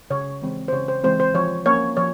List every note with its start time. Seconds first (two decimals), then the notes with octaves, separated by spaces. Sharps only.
0.10 C#3 C#5
0.42 E3 G#3 C4
0.68 C5
0.72 C#3 C#5
0.88 C5
1.04 E3 G#3 C4 C5
1.20 C5
1.34 F3 C#5
1.66 A#3 C#4 C#5
1.97 F3 C#5